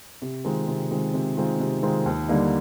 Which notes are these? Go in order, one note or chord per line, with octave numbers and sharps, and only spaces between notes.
C3
D#3 G#3 C4 F4
C3
D#3 G#3 C4 F4
C3
D#3 G#3 C4 F4
C3
D#3 G#3 C4 F4
D#2
D3 G3 A#3 D#4